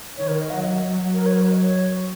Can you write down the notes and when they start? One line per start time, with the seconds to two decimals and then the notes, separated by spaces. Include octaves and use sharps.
0.15 D#3 C#5
0.28 A#4
0.40 D#5
0.50 F#3 F#5
0.61 D#5
0.89 F#3
1.14 A#4
1.26 C#5
1.33 A#4
1.38 C#5
1.51 D#5
1.63 C#5